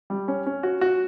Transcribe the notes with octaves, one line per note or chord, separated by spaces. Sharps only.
G3
C#4
C#4
F#4
F#4